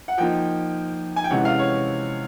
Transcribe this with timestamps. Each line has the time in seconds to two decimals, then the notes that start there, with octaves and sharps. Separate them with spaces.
0.08 F#5
0.18 F3 A#3 D#4 G5
1.16 G#5
1.24 G5
1.30 C3 E3 G#3 C#4 F#5
1.45 F5
1.59 C#5